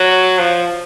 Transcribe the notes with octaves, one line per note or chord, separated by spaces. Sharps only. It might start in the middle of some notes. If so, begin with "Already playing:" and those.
Already playing: F#3
F3